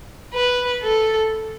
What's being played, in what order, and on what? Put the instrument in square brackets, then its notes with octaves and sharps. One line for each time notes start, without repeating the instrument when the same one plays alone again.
[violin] B4
A4